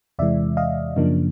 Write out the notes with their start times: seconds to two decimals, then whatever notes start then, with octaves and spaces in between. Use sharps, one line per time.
0.19 E2 C3 E3 G#3 D5 E5
0.57 D#5 F5
0.96 F#2 C#3 F3 A#3 D4